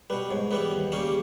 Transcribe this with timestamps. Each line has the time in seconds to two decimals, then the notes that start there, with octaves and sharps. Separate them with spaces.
0.10 B2 G3 B4
0.30 G#2 C#5
0.51 E3 G3 B3 B4
0.71 D#2 G4
0.92 C#3 G3 A#3 C#4 G4
1.03 G4